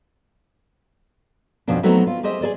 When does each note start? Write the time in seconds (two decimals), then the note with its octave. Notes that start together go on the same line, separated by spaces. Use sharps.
1.68 F2 B2 C#4 D4
1.83 F#3 A3 B3 C4 D#4 E4
2.07 F4
2.23 G4 G#4 C5 D#5 E5
2.41 G#4 A4 D5 D#5